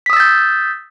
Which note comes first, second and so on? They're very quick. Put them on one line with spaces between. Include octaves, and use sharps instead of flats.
B6 D#6 E6 A6 G6